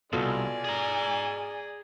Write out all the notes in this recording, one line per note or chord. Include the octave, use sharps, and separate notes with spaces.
C2 F#2 B2 F4 A4 D5 G#5
G#4 A#5